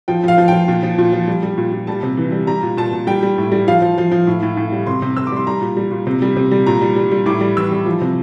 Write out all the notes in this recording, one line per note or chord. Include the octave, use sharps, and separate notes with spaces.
F3 G5
F3 F5
F3
F3 G5
A#2
F3
A#2
F3
G3
G3
A#2
A#2
G3 A5
C3
E3
G3
G3 A#5
A#2
A#2 A5
A#2
G3 G5
G3
A2
G3
F3 F5
F3
F3
F3
A2
A2
A2
G3
C3 C6
C3
C3 E6
D6
G3 C6
G3 A#5
A#2
G3
A#2
C3
G3
C3
G3
A#2 A#5
G3
G3
G3
A2 D6
G3
E3 E6
G3
F3
C3